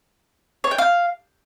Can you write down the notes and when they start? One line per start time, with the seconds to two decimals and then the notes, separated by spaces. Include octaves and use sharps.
0.64 C#5
0.71 G5
0.78 F5